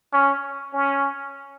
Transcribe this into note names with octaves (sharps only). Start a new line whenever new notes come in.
C#4
C#4